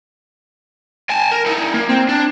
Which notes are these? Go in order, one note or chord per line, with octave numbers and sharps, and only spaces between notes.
G#5 A5
A#4
D#4 E4
A#3
C4
D4